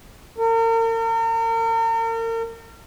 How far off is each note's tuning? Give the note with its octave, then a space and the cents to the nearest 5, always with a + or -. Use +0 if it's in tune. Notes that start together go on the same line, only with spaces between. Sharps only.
A#4 -40